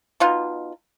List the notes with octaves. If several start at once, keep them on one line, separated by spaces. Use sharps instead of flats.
B2 D#4 F4